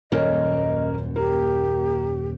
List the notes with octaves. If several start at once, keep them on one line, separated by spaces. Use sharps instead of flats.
D#1 F#2 A#3 C#4 A#4 D#5
A#3 G4